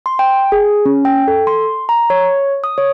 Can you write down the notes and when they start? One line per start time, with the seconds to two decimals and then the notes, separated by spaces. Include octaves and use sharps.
0.06 C6
0.19 G5
0.52 G#4
0.86 C#4
1.05 G5
1.28 A4
1.47 C6
1.89 A#5
2.10 C#5
2.64 D#6
2.78 C#5